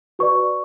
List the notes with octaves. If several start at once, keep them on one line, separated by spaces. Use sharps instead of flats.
F#4 B4 D5 C#6